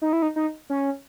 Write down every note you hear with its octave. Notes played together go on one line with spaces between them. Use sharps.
D#4
E4
D#4
D#4
C#4